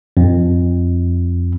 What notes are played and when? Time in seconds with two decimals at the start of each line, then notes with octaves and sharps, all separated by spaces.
0.17 F2